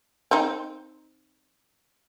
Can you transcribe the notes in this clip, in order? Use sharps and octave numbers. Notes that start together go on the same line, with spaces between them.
C4 D#4